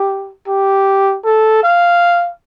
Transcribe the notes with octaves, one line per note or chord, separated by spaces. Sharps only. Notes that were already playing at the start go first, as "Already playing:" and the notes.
Already playing: G4
G4
A4
F5